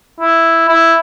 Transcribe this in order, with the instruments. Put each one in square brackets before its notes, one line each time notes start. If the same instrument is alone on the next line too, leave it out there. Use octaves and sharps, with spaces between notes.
[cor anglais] E4
E4